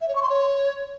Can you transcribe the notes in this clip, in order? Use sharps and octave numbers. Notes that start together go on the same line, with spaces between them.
E5
C#5
C#6
C6
C#5